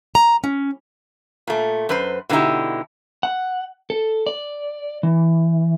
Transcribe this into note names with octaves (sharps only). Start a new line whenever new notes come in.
A#5
C#4
A#2 A3
F#2 B4 C5
B2 D3 B3 D#4 E4 G4
F#5
A4
D5
E3